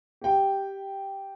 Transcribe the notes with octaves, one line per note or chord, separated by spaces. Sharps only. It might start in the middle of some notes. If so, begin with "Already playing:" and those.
G4 G5